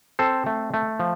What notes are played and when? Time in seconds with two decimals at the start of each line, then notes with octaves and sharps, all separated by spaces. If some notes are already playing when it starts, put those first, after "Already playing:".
0.19 C4 A4 C5
0.46 A3
0.74 A3
0.99 F3